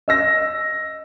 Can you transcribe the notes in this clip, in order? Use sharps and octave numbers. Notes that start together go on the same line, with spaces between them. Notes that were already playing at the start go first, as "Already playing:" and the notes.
D#5 E6 A#6